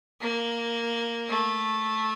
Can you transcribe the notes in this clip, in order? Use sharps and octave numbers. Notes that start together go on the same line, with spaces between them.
A#3
A3